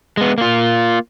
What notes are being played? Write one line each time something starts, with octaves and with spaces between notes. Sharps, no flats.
G#3 B3
A#3 F4